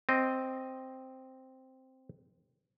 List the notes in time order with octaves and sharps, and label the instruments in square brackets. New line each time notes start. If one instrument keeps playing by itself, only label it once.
[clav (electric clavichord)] C4 D#5